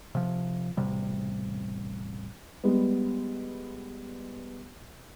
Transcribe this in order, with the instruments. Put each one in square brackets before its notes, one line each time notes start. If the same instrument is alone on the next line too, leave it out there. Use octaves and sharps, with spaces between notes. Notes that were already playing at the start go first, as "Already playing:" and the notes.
[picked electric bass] C3 F3
E1 A1 C3 G3
[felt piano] G3 G#3 B3